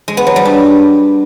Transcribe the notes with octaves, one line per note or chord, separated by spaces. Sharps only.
G#3
B3
F#3
G3
D4